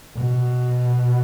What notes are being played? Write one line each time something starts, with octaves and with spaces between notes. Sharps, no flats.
B2